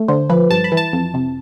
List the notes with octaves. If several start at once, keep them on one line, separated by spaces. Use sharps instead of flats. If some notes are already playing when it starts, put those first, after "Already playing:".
Already playing: A3
D3 C5
F3 B4
G2 A5
B5
E3
A5
F2
C3